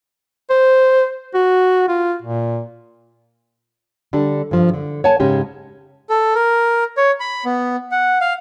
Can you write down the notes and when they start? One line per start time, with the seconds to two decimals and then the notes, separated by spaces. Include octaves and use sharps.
0.50 C5
1.34 F#4
1.88 F4
2.22 A#2
4.13 D3 G3 D4
4.51 G2 F3
4.74 D3
5.04 C#5 F#5 G#5 A5
5.20 G#2 C#3 G#3 C#4 G4
6.09 A4
6.35 A#4
6.97 C#5
7.20 B5
7.45 B3
7.91 F#5
8.21 F5